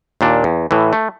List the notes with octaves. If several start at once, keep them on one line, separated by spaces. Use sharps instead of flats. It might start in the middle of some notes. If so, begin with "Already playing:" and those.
D#2 A#2 D4
E2
A2 E3
A3